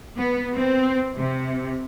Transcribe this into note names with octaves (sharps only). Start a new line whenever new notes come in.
B3
C4
C3